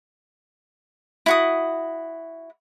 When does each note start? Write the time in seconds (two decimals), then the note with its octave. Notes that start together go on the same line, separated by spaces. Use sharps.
1.26 E4 F#4 D#6